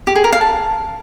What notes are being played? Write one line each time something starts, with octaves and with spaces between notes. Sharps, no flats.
G4
G#4
A#4
F5
A5